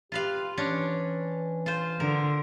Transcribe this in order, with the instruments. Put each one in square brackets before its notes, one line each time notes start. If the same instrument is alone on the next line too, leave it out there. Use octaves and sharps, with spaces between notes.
[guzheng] F4 B4 F5 [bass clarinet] G4
[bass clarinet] E3 [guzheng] C#4 D4
[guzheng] F4 C5
[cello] D3 [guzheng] A#4